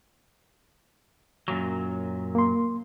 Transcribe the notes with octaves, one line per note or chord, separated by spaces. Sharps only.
F#2 A#2 F#3
A#3 C6